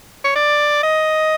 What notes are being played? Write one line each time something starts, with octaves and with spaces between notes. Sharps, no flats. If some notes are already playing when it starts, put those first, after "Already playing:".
C#5
D5
D#5